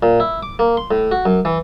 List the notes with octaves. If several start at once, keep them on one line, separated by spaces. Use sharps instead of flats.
A#2
E4
D6
A#3
C6
A2
F#4
F#2
E3